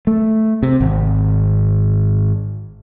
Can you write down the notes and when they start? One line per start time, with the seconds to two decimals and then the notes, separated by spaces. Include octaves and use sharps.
0.07 A3
0.63 C3
0.80 G#1